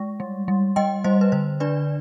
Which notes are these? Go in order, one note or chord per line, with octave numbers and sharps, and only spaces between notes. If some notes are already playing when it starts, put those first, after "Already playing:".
Already playing: G#3
G3
G3
G3 D#5 G5
G3 C5 D#5
B4
D3 C5
D4 B4 D5